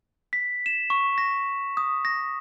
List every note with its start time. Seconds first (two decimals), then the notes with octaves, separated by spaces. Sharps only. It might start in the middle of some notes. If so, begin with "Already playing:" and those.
0.33 B6
0.66 E7
0.90 C#6
1.18 A#6
1.77 D#6
2.05 A#6